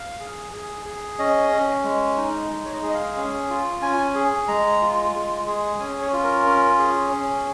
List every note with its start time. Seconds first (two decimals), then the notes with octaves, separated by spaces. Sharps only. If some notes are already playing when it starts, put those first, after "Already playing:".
Already playing: F5
0.20 G#4
0.53 G#4
0.85 G#4
1.19 C#4 D#5
1.52 C#4
1.84 G#3
2.17 D#4
2.50 G#3
2.65 C#5
2.73 D#5
2.83 G#4
2.90 D#5
2.94 F5
3.17 C#4
3.50 F4
3.82 C#4 G#5
4.15 G#4
4.48 G#3 A#5
4.82 F4
5.14 G#3
5.47 G#4
5.80 C#4 G#5
6.01 C#5
6.13 F4
6.24 A#4
6.46 C#4
6.79 G#4
7.12 C#4